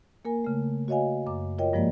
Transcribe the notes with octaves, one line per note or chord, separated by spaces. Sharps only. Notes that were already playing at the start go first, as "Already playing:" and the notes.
A#3 A#4 G#5
C#3 A3
F#4 C#5 D#5 F5 G#5
F#2 D6
F4 A#4 C#5 D#5 G5
G2 F3 G#3 A#3 D5